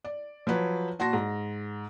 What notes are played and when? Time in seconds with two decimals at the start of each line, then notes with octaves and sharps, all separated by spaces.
0.05 D5
0.47 F3 F#3 B4 C#5
0.99 A#2 F#4 A5 C6 A#6
1.13 G#2